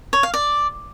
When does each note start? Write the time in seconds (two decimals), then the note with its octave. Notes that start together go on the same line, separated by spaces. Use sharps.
0.13 C#5
0.23 F5
0.34 D5